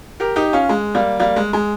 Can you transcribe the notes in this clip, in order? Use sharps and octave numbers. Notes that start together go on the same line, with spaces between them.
G4 A#4
D#4 G4
C#4 F4
G#3
G3 A#3
G3 A#3
G#3
G#3